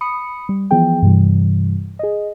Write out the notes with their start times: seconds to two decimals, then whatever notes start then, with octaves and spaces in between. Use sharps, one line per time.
0.01 B5 D#6 C#7
0.49 G3
0.71 E3 F3 B3 G#4 G5
1.02 G2 C3 E3 G3
1.99 G#4 D#5